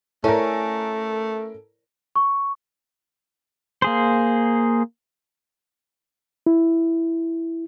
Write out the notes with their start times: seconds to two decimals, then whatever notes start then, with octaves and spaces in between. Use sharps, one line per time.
0.24 A3 C#4 E4 A4 A#4
2.16 C#6
3.82 A#3 G#4 C5
6.46 E4